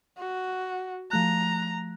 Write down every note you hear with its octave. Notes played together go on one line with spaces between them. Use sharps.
F#4
F3 A3 A#5 F#6